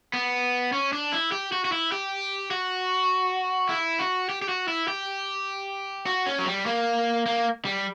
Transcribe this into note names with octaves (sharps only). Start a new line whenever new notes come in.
B3
C#4
D4
E4
G4
F#4
F#4
E4
G4
F#4
E4
F#4
G4
G4
F#4
E4
G4
F#4
C#4
F#3
G3
A#3
A#3
G3